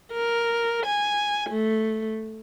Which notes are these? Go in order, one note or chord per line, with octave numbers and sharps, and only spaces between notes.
A#4
G#5
A3